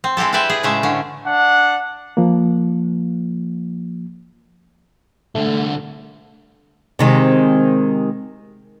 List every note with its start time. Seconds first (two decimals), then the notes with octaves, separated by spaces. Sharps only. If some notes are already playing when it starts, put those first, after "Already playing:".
0.04 C4
0.17 G#3 C4 E4 G4 A4
0.33 E4 A4 B4 D5 E5 G5
0.49 G#4
0.63 A2 C#3 G#3 A3 E5
0.83 D3 C#4
1.25 D4 F#5
2.17 F3 A#3
5.35 C2 D3 A3
6.99 C3 D#3 G#3